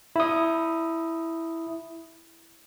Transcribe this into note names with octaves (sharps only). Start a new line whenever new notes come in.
E4 D#6